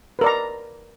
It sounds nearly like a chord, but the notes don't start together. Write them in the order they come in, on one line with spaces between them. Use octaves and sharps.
B4 A#4 D5 A#5